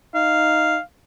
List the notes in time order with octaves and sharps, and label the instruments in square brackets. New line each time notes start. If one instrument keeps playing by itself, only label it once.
[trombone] D#4 [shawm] F5